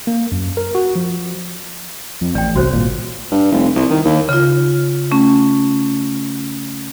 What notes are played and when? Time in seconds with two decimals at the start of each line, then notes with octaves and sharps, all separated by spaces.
0.07 A#3
0.32 F#2
0.57 A#4
0.75 F#4
0.96 F3
2.21 F2
2.35 A1 D5 G5
2.56 C2 F#4 C5 C#5
2.73 G#1 A#2
3.32 G2
3.52 F1
3.76 C2
3.90 D#3
4.05 D#2
4.29 C#3 F4
5.11 A3 C#4